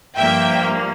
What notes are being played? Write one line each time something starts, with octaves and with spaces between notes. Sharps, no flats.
G2 F3 A#3 E5 G5